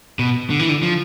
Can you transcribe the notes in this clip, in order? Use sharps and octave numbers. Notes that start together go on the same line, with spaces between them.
B2
D3
E3
D3
F3